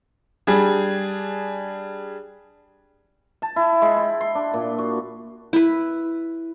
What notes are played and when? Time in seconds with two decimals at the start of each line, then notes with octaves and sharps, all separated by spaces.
0.47 G3 D4 G#4
3.42 A5
3.56 E4
3.82 G#3
3.97 G5
4.21 C6
4.35 D4
4.54 A#2
4.78 F#4
5.53 E4 B4